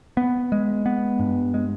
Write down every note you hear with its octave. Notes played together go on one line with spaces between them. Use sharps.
B3
G#3
B3
G2
G#3